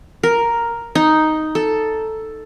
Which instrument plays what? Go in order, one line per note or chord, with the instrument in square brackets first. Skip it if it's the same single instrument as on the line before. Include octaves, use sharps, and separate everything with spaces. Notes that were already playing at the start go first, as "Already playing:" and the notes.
[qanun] A#4
D#4
A4